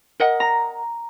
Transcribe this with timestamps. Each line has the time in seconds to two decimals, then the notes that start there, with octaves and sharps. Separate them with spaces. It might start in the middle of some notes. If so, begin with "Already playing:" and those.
0.20 A#4 D#5 F#5
0.40 A#5